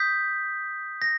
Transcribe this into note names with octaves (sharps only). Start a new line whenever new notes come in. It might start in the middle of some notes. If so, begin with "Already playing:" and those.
Already playing: D#6 G6 B6
A#6